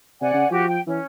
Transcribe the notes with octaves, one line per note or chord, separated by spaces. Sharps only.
C3 D5 F#5 G#5
C#3
F3 F#4 G4
G5
E3 C#4